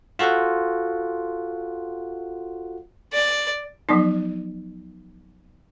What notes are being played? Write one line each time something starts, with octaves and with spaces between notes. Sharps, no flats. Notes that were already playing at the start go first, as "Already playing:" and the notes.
F4 F#4 A4 C5 F#5
D5
F3 F#3 B3 D#4